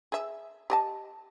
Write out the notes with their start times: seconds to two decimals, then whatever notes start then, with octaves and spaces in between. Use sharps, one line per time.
0.12 G#4 E5
0.70 G4 D#5 A5